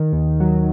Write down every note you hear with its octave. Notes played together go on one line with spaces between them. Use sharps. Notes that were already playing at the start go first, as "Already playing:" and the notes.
Already playing: D#3
D#2
F#3